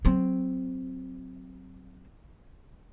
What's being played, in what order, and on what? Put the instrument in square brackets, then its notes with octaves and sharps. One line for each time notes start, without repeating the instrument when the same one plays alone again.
[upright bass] F#3 C4